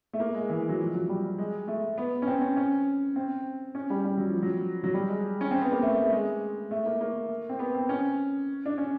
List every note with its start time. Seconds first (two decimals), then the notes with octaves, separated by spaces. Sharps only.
0.13 A3
0.20 A#3
0.35 G#3
0.49 E3
0.69 F#3
0.79 F3
0.94 F#3
1.09 G3
1.38 G#3
1.68 A3
1.98 B3
2.22 C#4
2.27 C4
2.42 C#4
2.56 C#4
3.16 C4
3.75 C#4
3.90 G3
4.04 G3
4.17 F#3
4.29 F3
4.42 F#3
4.84 F#3
4.94 G3
5.08 G#3
5.41 C#4
5.51 C4
5.61 B3
5.72 A#3
5.82 A3
6.04 A3
6.12 G#3
6.71 A3
6.86 A#3
7.01 A#3
7.49 C4
7.59 B3
7.75 C4
7.89 C#4
8.66 D4
8.78 C#4